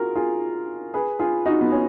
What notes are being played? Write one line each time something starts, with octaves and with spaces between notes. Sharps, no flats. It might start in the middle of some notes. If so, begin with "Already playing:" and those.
Already playing: F4 F#4 G#4 A#4
F4 G#4
G#4 B4
F4 G#4
D#4 F#4
B3
C#4